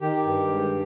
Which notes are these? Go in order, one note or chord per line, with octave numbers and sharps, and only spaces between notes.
D#3 G4
G2
G#2